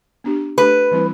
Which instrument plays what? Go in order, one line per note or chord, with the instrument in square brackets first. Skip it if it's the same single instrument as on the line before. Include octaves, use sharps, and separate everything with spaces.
[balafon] B3 D4 G4
[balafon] A3 D4 G4 [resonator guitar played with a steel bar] B4
[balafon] E3 G3 C4 E4